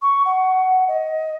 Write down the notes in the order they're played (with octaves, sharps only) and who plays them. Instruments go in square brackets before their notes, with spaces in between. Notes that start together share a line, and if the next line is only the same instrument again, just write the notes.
[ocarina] C#6
F#5
D#5